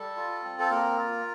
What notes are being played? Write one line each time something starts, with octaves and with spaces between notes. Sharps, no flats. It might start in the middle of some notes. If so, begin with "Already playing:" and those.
Already playing: G3 A4
F4
C4
A4
A#3 A#4
F4